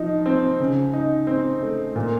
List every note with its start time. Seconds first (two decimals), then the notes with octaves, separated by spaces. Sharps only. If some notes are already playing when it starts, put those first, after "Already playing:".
Already playing: F3 D#4
0.26 C4
0.60 C#3
0.93 D#4
1.27 C4
1.62 A3
1.95 A#2